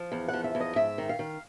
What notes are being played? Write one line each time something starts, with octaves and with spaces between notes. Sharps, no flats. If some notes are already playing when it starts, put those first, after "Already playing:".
Already playing: F3
E2
F3 F#5
E5
E2
D#5
G#2 E5
D#3
F5
D#3